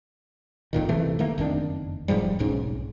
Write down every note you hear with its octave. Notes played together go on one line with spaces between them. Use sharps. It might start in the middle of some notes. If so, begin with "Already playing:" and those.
E1 F2 A#2 D#3
F#1 C3 E3 A3
D#3 A3 A#3
F#1 F2 D#3 D4
E1 G#2 F3 G3
F1 B1 G#2 C#4